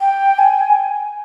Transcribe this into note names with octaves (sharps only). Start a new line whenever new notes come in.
G5
G#5